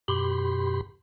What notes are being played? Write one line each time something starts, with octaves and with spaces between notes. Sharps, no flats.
F#2 B2 G4 B5 C6